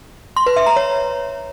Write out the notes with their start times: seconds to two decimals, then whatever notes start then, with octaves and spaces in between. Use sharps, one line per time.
0.36 C6
0.46 B4
0.56 E5
0.66 A#5
0.76 C#5